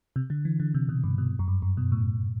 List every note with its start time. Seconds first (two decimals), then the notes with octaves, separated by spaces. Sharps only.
0.16 C3
0.30 D3
0.45 E3
0.60 D3
0.74 C3
0.89 B2
1.04 G2
1.18 B2
1.39 F#2
1.48 G2
1.62 F#2
1.77 B2
1.92 A2